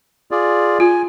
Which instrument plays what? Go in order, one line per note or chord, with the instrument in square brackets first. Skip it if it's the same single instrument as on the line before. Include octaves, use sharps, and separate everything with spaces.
[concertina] F4 G#4 D5
[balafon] F4 [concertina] G#5